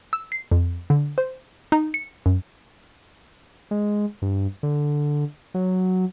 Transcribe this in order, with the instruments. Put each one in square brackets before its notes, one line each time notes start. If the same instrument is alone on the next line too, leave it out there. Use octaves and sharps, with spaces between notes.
[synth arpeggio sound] E6
C7
F2
D3
C5
D#4
C#7
F#2
[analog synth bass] G#3
G2
D3
F#3